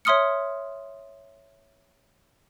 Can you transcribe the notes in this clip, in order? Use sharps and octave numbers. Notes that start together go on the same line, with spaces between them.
C#5 E5 C6 D#6 F6 C#7